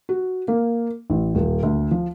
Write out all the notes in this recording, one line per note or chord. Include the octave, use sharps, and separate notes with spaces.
F#4
A#3
A1
D#1
D2
F3